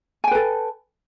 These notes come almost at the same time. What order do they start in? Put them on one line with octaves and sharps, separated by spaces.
G#5 G5 B4 A4